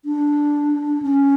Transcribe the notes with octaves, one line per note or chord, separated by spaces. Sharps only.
D4
C#4